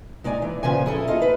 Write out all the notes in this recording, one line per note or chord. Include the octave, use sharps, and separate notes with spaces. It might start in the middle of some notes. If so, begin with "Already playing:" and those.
G#3 D#4 D5 G#5
E3
A#2 C#3 F3 B4 G#5
E4 G#4 A4
D#4 F4 D#5
B4